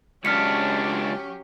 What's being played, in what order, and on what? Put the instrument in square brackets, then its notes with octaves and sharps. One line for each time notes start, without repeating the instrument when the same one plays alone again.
[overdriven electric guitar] C#2 D4 [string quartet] F#3 C#4 G4 [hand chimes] F6 B6 C#7